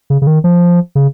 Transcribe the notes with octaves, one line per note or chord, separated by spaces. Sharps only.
C#3
C#3
D#3
F3
C#3